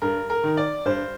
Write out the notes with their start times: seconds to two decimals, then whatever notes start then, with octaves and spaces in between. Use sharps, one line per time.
0.02 G2 A#4
0.30 A#4
0.44 D#3
0.57 D5
0.85 G2 C5